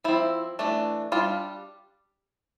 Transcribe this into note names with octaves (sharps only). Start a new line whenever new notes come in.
F3 C4 E4
E3 A3 D4
G3 D4 F4